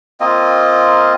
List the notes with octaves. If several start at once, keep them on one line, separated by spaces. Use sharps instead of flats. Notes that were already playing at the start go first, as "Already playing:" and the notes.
A#3 C4 F4 D#5